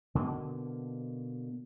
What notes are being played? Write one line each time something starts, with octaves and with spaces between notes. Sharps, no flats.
B2 D3 A#3